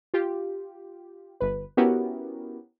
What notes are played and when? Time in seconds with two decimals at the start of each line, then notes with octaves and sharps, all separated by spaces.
0.14 F4 G4
1.40 G1 B4
1.77 B3 C#4 E4 F#4 G4 A#4